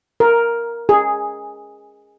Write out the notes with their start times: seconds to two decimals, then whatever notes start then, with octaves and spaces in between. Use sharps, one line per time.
0.20 A#4
0.89 G#4